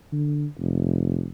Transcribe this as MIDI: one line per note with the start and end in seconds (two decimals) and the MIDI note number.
0.12 0.46 50
0.59 1.30 29